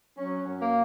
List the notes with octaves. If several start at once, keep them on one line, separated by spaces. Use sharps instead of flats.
F#3 C#4
F#2
A#3